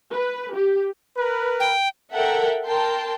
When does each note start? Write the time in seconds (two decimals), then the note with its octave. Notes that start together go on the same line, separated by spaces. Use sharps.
0.12 B4
0.54 G4
1.16 A#4 B4
1.60 G5
2.14 A4 A#4 E5 F#5 G5
2.65 A#4 G5 A5 C6